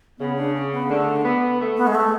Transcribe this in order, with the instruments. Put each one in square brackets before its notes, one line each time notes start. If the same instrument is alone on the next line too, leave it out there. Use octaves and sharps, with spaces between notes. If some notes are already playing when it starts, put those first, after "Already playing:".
[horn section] C#3 [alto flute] B3
[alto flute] D4
C#4
B3
[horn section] D3 [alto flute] A3
[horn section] B3
A3
[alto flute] B3
G#3
A3